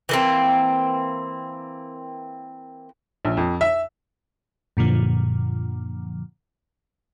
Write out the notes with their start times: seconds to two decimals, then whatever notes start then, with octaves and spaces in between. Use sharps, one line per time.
0.09 E3 A#3 C4
3.25 A#1
3.37 F2
3.61 E5
4.77 F#2 A#2 D3 F3